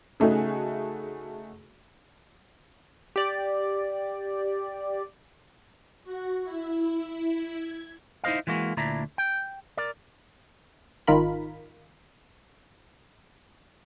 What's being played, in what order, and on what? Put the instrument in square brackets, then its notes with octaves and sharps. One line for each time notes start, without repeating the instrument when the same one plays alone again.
[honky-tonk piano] C#3 A3 D#4 F#4 G#4
[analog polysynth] G4 D5
[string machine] F#4
E4
G#6
[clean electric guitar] D#4 E4 C5 D#5 F5
E3 G#3 A#3 F#4
D2 A#2 D4 E4 A#5
G5
A#4 D5
[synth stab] G#1 D#3 F4 A#4 B5